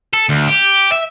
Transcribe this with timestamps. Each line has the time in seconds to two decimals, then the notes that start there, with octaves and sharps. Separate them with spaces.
0.14 A4
0.29 D2
0.48 G4
0.92 E5